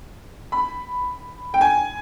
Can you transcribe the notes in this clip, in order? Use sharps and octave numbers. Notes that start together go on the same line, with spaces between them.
B5
G5
G#5